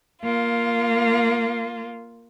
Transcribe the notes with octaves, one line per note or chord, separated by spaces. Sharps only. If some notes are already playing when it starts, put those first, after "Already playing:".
A#3 F4